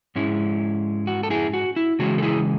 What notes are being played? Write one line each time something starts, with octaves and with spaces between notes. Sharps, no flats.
G#2 G#3 C#4 E4
F#4
A4
E4 G#4
F#4
E4
C#3 E3 G#3 C#4 E4 F#4
A4
E4 G#4